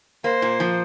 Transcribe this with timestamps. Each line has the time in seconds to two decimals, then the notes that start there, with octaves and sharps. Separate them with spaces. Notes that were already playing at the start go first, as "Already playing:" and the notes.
0.24 A#3 C5
0.42 A#2
0.60 F3